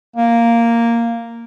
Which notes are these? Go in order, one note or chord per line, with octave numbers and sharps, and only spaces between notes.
A#3